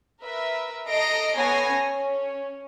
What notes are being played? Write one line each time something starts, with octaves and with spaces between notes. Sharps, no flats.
A#4 B4 E5
A4 D#5 A#5 A#6 C7 D7
B3 A4 C#5 G#5 A#6 C7
C#4